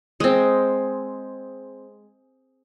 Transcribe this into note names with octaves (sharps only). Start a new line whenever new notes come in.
G#3 C4